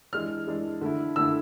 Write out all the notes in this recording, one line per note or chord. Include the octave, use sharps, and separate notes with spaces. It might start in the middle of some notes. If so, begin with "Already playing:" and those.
E3 G#3 D4 F6
E3 G#3 D4
D3 A3 E4
D3 A3 E4 E6